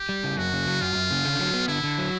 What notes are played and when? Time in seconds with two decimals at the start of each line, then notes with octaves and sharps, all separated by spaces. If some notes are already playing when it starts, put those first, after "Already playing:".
Already playing: G4
0.09 G3
0.24 C#3
0.37 F#2 F#4
0.52 C#3
0.67 F#3
0.81 F#2 F4
0.95 F#2
1.11 C#3
1.25 D3
1.39 F#3
1.54 B3
1.68 D3 E4
1.84 D3
1.98 F#3